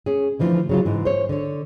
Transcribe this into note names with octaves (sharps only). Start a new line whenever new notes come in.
C#4 G#4
D3 E3 F3 G#3 A3
C#3 F#3 F4
G#2 E3
C5 C#5
D3 C#5